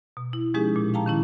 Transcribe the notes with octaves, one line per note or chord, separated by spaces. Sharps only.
B2
E4
F3 G#3 C#4 D#4 G4 G#4
A#2
F5 G5 A5 A#5
D#3 C#4 E4